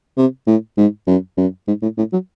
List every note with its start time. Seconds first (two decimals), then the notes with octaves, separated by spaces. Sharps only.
0.17 C3
0.47 A2
0.77 G#2
1.07 F#2
1.37 F#2
1.68 G#2
1.82 A2
1.98 A2
2.13 F#3